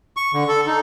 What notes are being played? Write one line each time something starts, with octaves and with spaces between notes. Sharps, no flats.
C#6
D3
A4
D#4